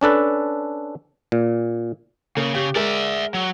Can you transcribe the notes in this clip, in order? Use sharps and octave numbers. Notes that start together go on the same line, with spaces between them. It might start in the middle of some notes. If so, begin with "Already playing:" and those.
C#4 D4 A4 B4
A#2
C#3 A#3
C#3 G4
G#3 A#4 D5 E5
F#3